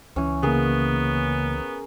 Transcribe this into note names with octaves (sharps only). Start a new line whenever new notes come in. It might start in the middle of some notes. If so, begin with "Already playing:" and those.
C#2 E3 C#4
C#3 A#3 B3 G#4 A#4